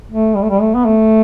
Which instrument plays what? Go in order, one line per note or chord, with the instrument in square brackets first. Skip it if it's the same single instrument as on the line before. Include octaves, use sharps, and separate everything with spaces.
[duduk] A3
G3
A3
G3
A3
B3
A3